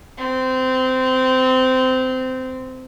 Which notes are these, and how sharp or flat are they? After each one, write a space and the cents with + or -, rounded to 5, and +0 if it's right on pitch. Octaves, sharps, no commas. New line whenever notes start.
C4 -20